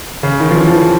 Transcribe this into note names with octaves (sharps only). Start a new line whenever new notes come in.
C#3
D#3
F3
E3
F3
E3